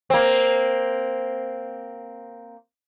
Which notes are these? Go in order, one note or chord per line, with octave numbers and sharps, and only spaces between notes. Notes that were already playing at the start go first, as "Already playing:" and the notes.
A#3 C4